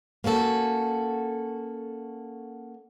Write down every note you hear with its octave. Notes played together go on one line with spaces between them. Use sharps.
A#3 C#4 F#4 A4